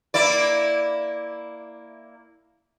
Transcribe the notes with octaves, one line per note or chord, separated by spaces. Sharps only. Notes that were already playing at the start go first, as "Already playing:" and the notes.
A#3 E4 D5